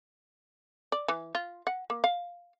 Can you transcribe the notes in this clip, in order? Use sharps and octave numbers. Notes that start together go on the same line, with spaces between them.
D5
E3
F4
F#5
A#3
F5